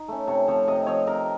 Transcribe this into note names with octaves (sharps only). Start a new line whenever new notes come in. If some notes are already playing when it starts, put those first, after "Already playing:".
Already playing: D#4
A3 C#4
C3 C#5
F3 C4 C#5
C3 D#5
F3 C4 C#5
C3 A#4